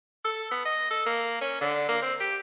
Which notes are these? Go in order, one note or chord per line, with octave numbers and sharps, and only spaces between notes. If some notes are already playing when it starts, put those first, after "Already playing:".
A4
B3
D#5
A4
A#3
C#4
D3
A#3
C4
G4